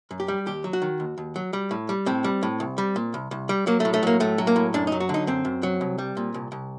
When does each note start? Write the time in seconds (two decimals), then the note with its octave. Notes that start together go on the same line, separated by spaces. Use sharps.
0.11 F#2
0.20 G4
0.28 G3
0.46 D#2 G4
0.64 F#3
0.73 F#4
0.82 D#3
1.00 D#2
1.18 D#2
1.36 F#3
1.53 G3
1.71 A2
1.89 G3
2.06 A2 C4
2.24 G3
2.43 A2
2.60 C2
2.78 G3
2.96 A#2
3.14 C2
3.31 C2
3.49 G3
3.67 F#3 A#3
3.80 A3
3.85 A2
3.94 A3
4.03 F#3 A#3
4.20 A2 A3
4.38 F#3
4.47 A#3
4.56 A2
4.74 F#2 D4
4.87 D#4
4.92 F#3
5.00 F#4
5.09 D3 D#4
5.27 F#2 C4
5.45 F#2
5.63 F#3
5.81 C2
5.98 G3
6.17 A#2
6.34 C2
6.52 C2